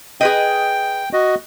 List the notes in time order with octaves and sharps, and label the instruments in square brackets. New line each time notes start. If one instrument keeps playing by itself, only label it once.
[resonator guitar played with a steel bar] G#4 B4 D#5 [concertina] G5
[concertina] F#4 D#5